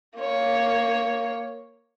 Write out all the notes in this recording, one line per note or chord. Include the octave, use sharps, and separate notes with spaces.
A#3 C#5